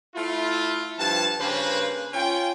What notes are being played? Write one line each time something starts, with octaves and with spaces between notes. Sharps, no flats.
A3 E4 F4
G2 F3 A5
G2 C#3 A#3 B4 C5
C#4 F4 G5